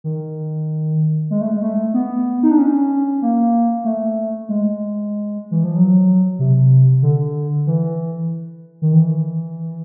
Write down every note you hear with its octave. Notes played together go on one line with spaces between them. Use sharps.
D#3
G#3
A3
G#3
A3
B3
D#4
D4
C#4
A#3
A3
G#3
E3
F3
F#3
C3
D3
E3
D#3
E3